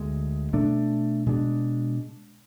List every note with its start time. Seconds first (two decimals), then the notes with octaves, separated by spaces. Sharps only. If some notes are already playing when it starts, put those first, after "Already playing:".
Already playing: D2 D3 G#3
0.53 B2 A3 D4
1.26 B2 G#3 D4